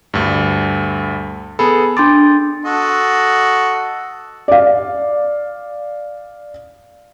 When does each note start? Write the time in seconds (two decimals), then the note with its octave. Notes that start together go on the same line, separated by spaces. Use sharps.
0.14 D2 G2
1.59 B3 G#4 A4 B5
1.97 D4 C6 D6 A6
2.65 F#4 A4 D#5
4.48 D5 F5